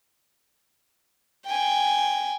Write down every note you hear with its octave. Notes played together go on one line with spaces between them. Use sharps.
G5 G#5